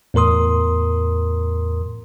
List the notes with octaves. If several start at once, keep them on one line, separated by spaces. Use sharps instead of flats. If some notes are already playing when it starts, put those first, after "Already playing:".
E2 A2 A#4 C6 D#6